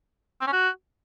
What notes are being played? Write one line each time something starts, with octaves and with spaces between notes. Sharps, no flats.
C4
C#4
F#4